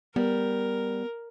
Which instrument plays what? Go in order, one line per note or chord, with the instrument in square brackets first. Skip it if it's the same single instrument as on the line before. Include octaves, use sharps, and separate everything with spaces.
[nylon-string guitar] G3 [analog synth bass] B3 [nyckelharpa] A#4